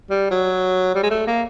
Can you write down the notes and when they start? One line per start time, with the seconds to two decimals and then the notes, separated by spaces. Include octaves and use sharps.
0.10 G3
0.31 F#3
0.95 G3
1.03 G#3
1.11 A3
1.27 A#3